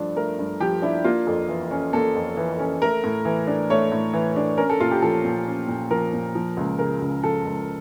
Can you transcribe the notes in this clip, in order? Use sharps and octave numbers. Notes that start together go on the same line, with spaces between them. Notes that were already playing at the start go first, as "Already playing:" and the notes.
Already playing: G2 F3 A3 D4
A3 A#4
G2
F3 G4
D4 E4
A#3 F4
F2
E3
C#4
A#3 A4
F2
E3
C#4
A3 A#4
A2
E3
D4
A3 C#5
A2
E3
D4
C#4 A#4
A4
A#2 F4
G4
F3 A4
A#2
C#4
A#2
F3 A#4
A#2
F3
C#2
C#3 A#4
C#2
F3 A4
C#2